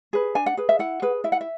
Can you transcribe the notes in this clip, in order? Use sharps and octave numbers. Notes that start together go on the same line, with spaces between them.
G#4 B4
D4 G#5
F#5
G#4 B4
E5
E4 F#5
G#4 B4
E4 E5
F#5
E5